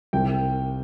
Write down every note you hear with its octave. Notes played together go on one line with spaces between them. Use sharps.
C2 C3 D#3 G5